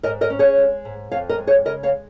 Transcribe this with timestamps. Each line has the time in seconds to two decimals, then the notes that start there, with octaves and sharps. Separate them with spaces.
0.03 G#2 A#4 D#5
0.21 A#4 D#5
0.30 C#4
0.39 G#4 C#5
0.58 G#3
0.85 G#2
1.12 F2 C#5 F5
1.29 A#4 D#5
1.38 G#3
1.47 G#4 C#5
1.65 C#3 A#4 D#5
1.83 C#5 F5